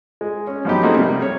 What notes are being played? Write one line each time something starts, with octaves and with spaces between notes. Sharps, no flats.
G#3
C#4
F3 F#3 B3 D#4 G4
A3 A#3 C4 D#4 F#4 G#4
C3 G3
C#5